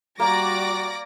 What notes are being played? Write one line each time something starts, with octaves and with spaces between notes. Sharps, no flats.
G3 A#3 F#4 D5 D6 A#6